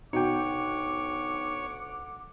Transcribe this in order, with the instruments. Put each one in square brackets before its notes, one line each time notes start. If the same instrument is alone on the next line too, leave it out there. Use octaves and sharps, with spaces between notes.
[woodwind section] D2 F#5 D6 [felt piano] B2 [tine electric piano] D#4 G5 [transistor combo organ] C#5